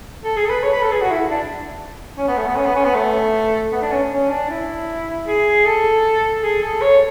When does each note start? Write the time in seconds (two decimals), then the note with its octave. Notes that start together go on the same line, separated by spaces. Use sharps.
0.24 A4
0.37 G#4
0.45 A4
0.50 B4
0.63 C#5
0.72 B4
0.83 A4
0.92 G#4
1.01 F#4
1.11 E4
1.31 D4
2.18 C#4
2.28 B3
2.37 A3
2.47 B3
2.56 C#4
2.66 B3
2.75 C#4
2.85 B3
2.95 A3
3.72 B3
3.82 D4
3.92 C#4
4.11 C#4
4.30 D4
4.50 E4
5.27 G#4
5.65 A4
6.43 G#4
6.62 A4
6.82 C#5